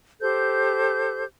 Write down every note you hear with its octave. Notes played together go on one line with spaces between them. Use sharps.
G4 A4 C5 G6